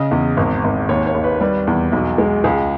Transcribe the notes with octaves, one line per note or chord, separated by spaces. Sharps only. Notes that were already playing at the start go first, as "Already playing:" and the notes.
Already playing: C#3 D#5
E2
G#1
G#1
D#2 C#5
C#5
D#2
B4
G3 B4
E2
B1
G#3
C#2 G#4